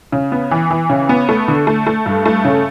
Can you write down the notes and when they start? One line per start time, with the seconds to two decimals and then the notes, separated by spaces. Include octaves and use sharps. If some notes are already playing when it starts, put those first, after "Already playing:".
0.12 C#3
0.32 B3
0.51 E3
0.71 E3
0.90 C#3
1.09 B3
1.29 A3
1.48 D3
1.67 A3
1.87 A3
2.06 G2
2.26 A3
2.45 C#3